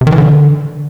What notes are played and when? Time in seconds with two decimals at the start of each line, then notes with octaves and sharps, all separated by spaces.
0.01 C3
0.07 D#3
0.12 E3
0.18 D3